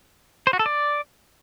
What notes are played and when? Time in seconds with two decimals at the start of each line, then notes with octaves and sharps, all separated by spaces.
0.47 C5
0.53 F#4
0.59 A4
0.66 D5